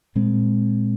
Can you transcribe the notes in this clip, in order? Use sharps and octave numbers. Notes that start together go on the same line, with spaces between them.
A#2 G#3 C4